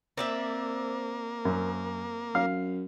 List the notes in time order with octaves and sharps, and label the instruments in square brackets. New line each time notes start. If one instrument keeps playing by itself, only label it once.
[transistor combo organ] A#3 [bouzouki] C4 D5 E5
[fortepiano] F#2
[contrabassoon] F#2 [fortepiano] F5